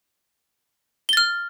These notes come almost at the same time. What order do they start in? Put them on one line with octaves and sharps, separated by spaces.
G7 A6 F6